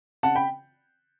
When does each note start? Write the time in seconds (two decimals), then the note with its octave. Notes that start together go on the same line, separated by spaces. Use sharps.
0.23 C#3 F#5 A5
0.36 G5 B5